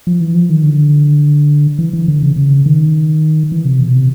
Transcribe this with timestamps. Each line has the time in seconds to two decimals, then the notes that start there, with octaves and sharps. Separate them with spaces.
0.07 F3
0.21 E3
0.35 F3
0.50 D#3
0.64 D3
1.79 E3
1.93 E3
2.08 D3
2.23 C#3
2.36 C#3
2.66 D#3
3.52 E3
3.65 C3
3.80 B2
3.95 C3